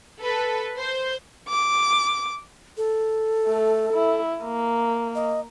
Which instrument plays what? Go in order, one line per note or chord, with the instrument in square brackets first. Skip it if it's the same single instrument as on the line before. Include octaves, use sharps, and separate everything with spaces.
[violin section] A4 B4
C5
[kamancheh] D6
[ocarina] A4
[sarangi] A3
E4
A#3
[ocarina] D#5